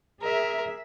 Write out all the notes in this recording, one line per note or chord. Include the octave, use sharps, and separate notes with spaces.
G#4 A#4 E5